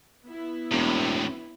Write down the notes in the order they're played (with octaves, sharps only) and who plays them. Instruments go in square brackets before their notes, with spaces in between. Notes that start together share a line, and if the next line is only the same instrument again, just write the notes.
[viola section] B3 E4
[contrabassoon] E1 [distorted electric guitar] A2 C3